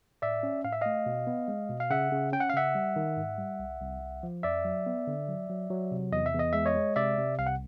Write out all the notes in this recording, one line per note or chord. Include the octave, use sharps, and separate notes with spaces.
A2 D5 E5
C#4
A2 F5
E5
A3 D#5 F5
B2
B3
G#3
B2
F5
C#3 E5 F#5
C#3
C#4 G5
F#5
F5
C#3 E5 F#5
G3
D#3
G#2
G3
C2
C2
C2
F3
F2 D5 E5
F#3
B3
D3
F#3
F#3
F#3
C3
E2 D#5
E5
E2
D#5
G#3 E5
C#5 D#5
G#3
C3 D5 E5
C3
C2 F5
F#5